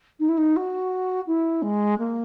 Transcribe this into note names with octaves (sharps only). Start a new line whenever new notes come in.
D#4
E4
D#4
F#4
E4
G#3
A#3